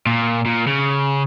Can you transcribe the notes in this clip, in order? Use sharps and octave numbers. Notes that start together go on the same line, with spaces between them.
A#2
A#2
C#3